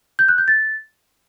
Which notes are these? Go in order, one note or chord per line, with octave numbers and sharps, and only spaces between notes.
G6
F#6
G6
A6